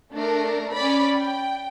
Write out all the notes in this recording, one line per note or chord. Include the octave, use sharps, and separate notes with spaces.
A3 D4 A#4
C#4 D5 B5
G5